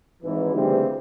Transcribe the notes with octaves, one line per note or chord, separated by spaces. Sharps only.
G#1 G#2 E3
D2 C#3 E3 G3 C4